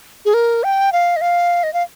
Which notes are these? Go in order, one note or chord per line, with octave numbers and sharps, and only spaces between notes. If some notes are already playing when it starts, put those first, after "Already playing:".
G#4
A#4
G5
F5
D#5
F5
D#5
F5